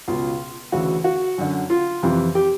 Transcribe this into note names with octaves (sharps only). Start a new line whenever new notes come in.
C#2 B2 F4
D2 C#3 E3 F#4
F#4
F#2 D3
F4
F2 C3 E3
G4